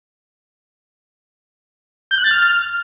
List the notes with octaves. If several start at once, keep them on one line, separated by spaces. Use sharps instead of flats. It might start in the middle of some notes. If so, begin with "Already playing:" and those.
G6
F#6
A6
F6